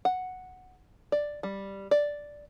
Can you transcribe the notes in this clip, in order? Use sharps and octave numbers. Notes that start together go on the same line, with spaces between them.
F#5
D5
G3
D5